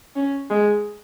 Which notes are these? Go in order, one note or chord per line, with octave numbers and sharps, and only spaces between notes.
C#4
G#3